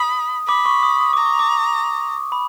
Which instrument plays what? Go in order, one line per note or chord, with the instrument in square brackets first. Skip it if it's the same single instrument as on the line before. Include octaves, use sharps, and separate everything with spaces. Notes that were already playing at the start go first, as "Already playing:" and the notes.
Already playing: [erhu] B5 [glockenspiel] D#6
[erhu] B5 [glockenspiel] D6
[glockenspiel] C#6
D#6
D#6
[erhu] A#5 [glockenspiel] D6
[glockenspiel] C#6
D6
D6
B5